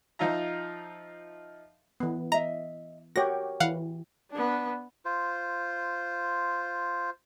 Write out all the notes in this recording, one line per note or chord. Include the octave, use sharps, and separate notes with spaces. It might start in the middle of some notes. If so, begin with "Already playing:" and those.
F3 D#4 F4 E5 A#5
E3 B3
D#5 E5 A#5
F#4 G4 A#4 C#5 A#6
E3 F5 F#5
B3 D4
F4 C5